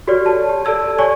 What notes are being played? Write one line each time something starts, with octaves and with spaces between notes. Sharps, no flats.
F#4 G4 A4 C#5 D5 F6
A5
G4
A4 D5 A5 E6 G#6
C#5 D5 G#5 C#6